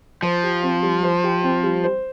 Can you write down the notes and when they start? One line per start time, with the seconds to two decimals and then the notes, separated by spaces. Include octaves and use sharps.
0.22 F3 C5
0.43 G4
0.63 C4
0.83 G3
1.03 C5
1.24 G4
1.43 C4
1.63 G3
1.84 C5